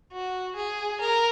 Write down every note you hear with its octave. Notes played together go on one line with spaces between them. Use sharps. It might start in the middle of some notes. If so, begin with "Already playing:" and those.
F#4
G#4
A#4